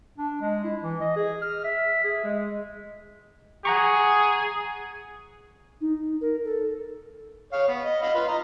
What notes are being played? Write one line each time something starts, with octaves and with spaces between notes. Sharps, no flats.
D4
G#3
E4
E3
D#5
G#4
F6
E5
G#4
G#3
G#4 F#5 A#5 C#6
D#4
A#4
A4
C#5 F5
B3
D#5
D#5 F5 B5
F4 B4
D#5 A#5